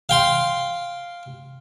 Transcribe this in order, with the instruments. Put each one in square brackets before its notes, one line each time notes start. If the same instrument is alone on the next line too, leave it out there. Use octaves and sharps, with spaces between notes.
[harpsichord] F5 G5 C6